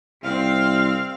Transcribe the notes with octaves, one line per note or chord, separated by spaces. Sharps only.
C2 C4 F5